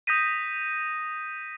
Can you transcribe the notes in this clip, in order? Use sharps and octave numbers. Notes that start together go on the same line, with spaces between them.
D#6 G6 A#6 B6 D#7